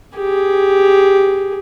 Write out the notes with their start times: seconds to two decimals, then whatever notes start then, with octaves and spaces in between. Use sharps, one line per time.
0.18 G4 G#4